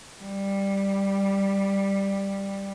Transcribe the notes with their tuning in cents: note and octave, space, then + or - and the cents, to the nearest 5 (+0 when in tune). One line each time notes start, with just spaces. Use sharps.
G3 +5